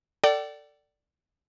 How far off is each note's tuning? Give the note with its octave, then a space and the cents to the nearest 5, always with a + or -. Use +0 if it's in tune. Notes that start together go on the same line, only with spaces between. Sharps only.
A4 +25 D5 +0 G5 -40